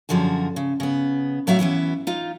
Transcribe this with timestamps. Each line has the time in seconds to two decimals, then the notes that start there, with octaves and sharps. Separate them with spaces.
0.09 F#2 D3 F3 F#4 G#4
0.56 C#3
0.80 C#3 B3
1.47 A2 F#3 C4 F#4 E5 F5
1.59 E3 B3 C#4 E4
2.07 D#4 F4